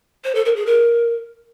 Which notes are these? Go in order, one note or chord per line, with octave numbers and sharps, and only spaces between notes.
C5
A4
A#4
G#4
A#4